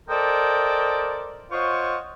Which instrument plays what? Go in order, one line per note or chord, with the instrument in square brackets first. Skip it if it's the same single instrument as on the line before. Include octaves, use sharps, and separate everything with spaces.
[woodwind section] A4 A#4 C5 D5 D#5 G5
F4 C5 C#5 D#5 F#5 C#6